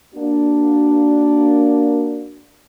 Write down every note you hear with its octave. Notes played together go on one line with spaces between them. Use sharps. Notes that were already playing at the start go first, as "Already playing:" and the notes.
A#3 D4 F#4